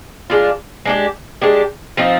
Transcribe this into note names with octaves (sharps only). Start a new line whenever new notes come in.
G#3 D4 F4
G#3 D4 G4
G#3 D4 G4
F3 C4 D#4